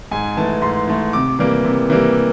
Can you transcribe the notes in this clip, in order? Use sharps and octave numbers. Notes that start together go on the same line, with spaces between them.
G#2 G#5
E3 A3 A5
G#2 C6
E3 A3
C3 D6
E3 G3 A#3
C3
E3 G3 A#3